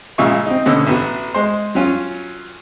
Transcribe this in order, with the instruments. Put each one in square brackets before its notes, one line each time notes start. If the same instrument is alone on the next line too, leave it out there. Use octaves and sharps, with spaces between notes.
[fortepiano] A#1 A#2 C#3 G#3 E5 C#6
C4 D#4
B2 D3 C#4 E6
A1 B3 F#4
G#3 C5
F#3 C#4 F4